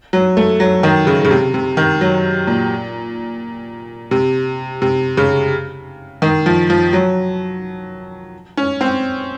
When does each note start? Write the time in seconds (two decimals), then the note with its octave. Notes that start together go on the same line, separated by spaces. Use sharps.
0.13 F#3
0.37 A3
0.60 F#3
0.83 D#3
1.07 C#3
1.25 C#3
1.31 C3
1.54 C3
1.77 D#3
2.01 F#3
2.47 A#2
4.11 C3
4.82 C3
5.17 C#3
6.22 D#3
6.46 F3
6.70 F3
6.93 F#3
8.57 C#4
8.81 C4